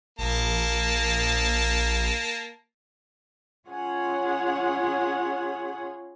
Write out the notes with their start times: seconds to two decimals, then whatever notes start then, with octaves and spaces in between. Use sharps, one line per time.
0.19 A#1 A#3 A5
3.67 C#4 F4 G#4 C#5 F#5 G#5